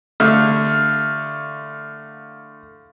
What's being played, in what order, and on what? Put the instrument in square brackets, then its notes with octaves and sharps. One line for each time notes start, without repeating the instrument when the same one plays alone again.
[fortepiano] D3 A3 [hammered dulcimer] F5